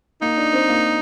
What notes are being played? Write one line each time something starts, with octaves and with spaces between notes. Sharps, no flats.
A#3 D#4
D4
C4
A#3